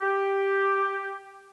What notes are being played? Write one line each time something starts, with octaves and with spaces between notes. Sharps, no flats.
G4